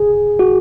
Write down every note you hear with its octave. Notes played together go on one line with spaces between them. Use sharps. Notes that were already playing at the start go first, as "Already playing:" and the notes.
Already playing: G#4
F#4